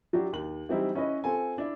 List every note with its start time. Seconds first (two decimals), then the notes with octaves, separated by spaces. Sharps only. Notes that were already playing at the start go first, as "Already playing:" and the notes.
0.13 F#3 D4 E4 F#4 G4
0.33 D#2 F#7
0.69 E3 F#3 G3 C4 D#4 E4
0.95 C#4 E4 B4 D#5
1.24 C4 F4 A4 G#5
1.58 D4 E4